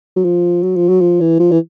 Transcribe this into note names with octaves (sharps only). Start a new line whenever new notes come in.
F#3
F3
F#3
F3
F#3
F3
E3
F3
E3